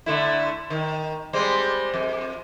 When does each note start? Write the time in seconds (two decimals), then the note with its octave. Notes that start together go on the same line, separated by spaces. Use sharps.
0.06 D3 A3 E4
0.70 D#3
1.33 G3 G#3 C4
1.94 F2